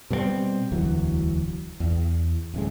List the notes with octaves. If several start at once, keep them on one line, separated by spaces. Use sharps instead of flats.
B2 G3 A3 C4
E1 D2 E3 F#3
E2
D1 C#3 G#3